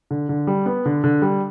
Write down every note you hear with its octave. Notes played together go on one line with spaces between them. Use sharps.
D3
D3
G3
B3
D3
D3
G3